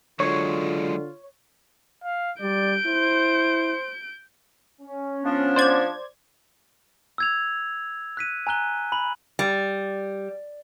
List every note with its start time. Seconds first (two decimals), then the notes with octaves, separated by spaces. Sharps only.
0.20 D3 F#3 G#3 F4 C#5
2.04 F5
2.41 G3 D5 G6 D7
2.86 E4 C5
4.81 C#4
5.23 F3 B3 D4
5.56 C5 D5 G#6
7.18 E6 G#6 F7
8.17 F#6 B6 D#7
8.47 G#5 A#5 F#6 G7
8.92 B5 F#7
9.39 G3